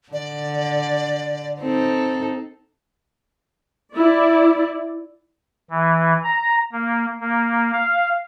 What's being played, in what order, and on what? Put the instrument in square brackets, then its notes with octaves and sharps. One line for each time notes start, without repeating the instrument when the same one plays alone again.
[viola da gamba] D3 [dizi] D5
[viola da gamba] C4 D#4 A4
[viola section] E4 D5
[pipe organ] E3
A#5
A#3
A#3
F5